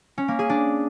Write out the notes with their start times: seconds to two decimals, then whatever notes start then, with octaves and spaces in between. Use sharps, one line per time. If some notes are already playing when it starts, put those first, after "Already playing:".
0.18 C#4
0.28 A#3
0.39 G#4
0.50 D4